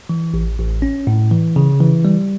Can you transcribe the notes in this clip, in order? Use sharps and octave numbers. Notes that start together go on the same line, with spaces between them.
E3
A1
A1
C#4
A2
E3
C#3
E3
G3